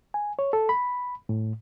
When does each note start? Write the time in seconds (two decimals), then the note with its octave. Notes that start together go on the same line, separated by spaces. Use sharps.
0.14 G#5
0.39 C#5
0.53 A4
0.69 B5
1.29 A2